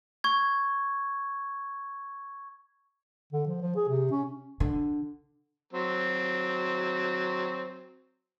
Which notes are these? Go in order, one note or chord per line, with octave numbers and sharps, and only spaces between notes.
C#6 G#6
D3
F3
F3
G#4
C3
C#4
D3
F#3 C4